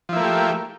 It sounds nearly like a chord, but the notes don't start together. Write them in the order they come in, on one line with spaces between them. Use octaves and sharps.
F3 E4 A#3 A3 G4